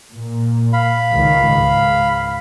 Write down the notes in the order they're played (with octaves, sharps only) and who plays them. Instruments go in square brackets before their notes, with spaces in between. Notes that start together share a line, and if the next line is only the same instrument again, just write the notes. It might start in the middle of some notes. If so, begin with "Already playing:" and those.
[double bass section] A#2
[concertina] F5 B5
[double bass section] C#2 D#3
G#2